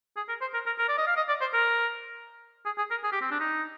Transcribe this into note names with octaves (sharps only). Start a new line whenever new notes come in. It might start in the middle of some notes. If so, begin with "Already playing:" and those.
G#4
A#4
C5
A#4
A#4
A#4
D5
D#5
F5
D#5
D5
C5
A#4
G#4
G#4
A#4
G#4
G4
C4
D4
D#4